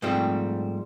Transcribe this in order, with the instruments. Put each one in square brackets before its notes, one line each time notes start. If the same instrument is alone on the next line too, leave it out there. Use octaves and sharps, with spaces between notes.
[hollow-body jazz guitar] G#2 F3 G3 A3 C4